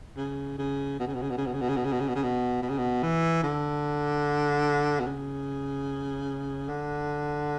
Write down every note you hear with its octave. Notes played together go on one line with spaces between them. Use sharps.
C#3
C#3
B2
C#3
B2
C#3
B2
C#3
B2
C#3
B2
C#3
B2
C#3
B2
C#3
B2
C#3
B2
B2
C#3
B2
E3
D3
B2
C#3
D3